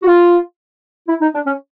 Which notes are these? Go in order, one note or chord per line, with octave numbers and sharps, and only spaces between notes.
F#4
F4
E4
D#4
D4
C#4